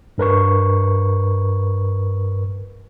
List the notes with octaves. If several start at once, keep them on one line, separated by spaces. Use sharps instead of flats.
G2 A#4 B4 C#6